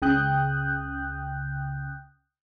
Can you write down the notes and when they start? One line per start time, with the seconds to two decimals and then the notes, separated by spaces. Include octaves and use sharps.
0.02 C#2 C#3 G5 D#6 F#6 G6